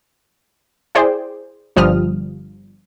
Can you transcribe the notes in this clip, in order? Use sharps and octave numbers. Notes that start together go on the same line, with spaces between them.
E4 G#4 C5 D5 G5
G1 F3 G3 D#6 F6